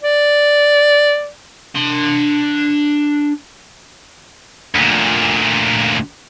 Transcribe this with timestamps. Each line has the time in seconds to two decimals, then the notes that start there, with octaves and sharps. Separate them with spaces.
0.03 D5
1.75 D4 C6
4.75 D2 A#2